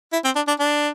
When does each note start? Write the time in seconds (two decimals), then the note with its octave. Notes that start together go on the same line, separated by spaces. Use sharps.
0.12 E4
0.24 C4
0.36 D4
0.48 D4
0.59 D4